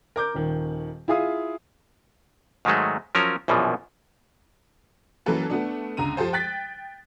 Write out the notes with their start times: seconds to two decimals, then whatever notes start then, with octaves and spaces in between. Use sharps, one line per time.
0.16 A#4 D6 G6
0.35 D#1 D#3
1.08 E4 F4 G#4 F5 D#6
2.65 G#2 D#3 F#3 G#3 A3
3.15 F3 F#3 C#4 A#4
3.48 A#1 F#2 B2 E3 F3
5.26 E3 F#3 A#3 C#4 A4 B4
5.50 A3 B3 D4
5.97 C#2 D3 A#5 D#7
6.17 F3 G4 A4 C5
6.33 G5 F#6 A6 B6